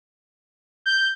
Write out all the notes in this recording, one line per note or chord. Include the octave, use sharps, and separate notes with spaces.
G6